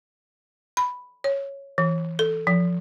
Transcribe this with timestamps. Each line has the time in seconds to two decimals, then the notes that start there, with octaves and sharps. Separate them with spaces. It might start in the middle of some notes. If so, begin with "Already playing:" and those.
0.77 B5
1.24 C#5
1.78 E3
2.19 A4
2.47 F3